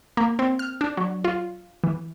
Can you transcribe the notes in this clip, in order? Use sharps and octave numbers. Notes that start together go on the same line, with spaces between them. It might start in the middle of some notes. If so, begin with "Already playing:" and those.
A#3
C4
F6
D4
F#3
F4
E3